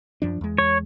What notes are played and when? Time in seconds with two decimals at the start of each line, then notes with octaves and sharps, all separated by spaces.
0.22 F#2 F3 D4
0.41 E2 G#3
0.58 C#5